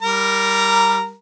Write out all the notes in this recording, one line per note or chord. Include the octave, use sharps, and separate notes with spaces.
G3 A#4 A#5